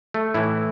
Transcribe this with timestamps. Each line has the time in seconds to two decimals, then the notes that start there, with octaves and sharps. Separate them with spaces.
0.14 A3
0.34 A2 E3 E4